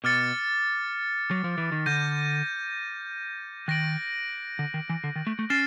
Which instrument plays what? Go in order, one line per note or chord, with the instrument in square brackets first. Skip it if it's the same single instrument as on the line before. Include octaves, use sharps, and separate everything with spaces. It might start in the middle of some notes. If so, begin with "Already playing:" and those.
[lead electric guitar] B2 [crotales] D6 F6 A6 C#7
[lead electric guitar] F#3
F3
E3
D#3
[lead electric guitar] D3 [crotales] G6 A#6 D#7
[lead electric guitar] D#3 [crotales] F#6 A#6 D7 F#7
[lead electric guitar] D3
D#3
E3
D3
D#3
A3
A3
[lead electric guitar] C#4 [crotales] F6 A6 C7 E7